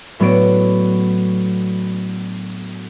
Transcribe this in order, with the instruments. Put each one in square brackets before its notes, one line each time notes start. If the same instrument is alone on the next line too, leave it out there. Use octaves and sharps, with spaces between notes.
[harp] A2 F#3 B3 D4 D7